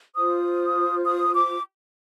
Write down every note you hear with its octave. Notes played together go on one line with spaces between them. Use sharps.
F4 C5 D#6
D#6
D6